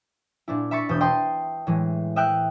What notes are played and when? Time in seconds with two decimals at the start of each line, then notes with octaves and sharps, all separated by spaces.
0.48 A#2 D4 E4
0.71 E5 B5 C#6 A6 B6 C#7
0.89 E1 B2 E5 D#6 G6
1.01 D#5 G5 A5 C6 D#6
1.67 A2 E3 G#3
2.16 D#5 E5 G5 E6 F#6 D7